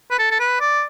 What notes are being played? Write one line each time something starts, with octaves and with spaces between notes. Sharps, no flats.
B4
A4
A4
B4
D5